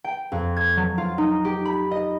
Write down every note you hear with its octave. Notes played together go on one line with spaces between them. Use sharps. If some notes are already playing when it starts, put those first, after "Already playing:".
G5
F2
G#6
F#3
F4
D#4
G4
B5
D#5